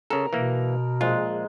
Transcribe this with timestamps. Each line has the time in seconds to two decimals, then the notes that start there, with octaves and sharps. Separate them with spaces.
0.10 C#3 A4 A#4
0.33 B2 E3 A#3
1.01 A#1 G#3 F4